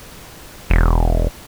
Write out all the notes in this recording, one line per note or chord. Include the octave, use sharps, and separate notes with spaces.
E1